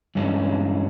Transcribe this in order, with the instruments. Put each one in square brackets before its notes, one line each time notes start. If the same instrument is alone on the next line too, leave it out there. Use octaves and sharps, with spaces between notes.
[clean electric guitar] G2 E3 G#3 C#4